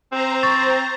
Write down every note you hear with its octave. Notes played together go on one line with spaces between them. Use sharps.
C4 C5 A#5
C#6 A6